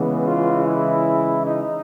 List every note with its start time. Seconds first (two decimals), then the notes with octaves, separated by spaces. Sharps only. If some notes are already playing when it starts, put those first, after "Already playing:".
Already playing: C#3 E3 G#3 B3
0.26 F4
0.66 E4
1.47 D#4